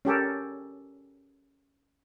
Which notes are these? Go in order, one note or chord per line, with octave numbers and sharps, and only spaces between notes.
C#4 G4 A4 A#4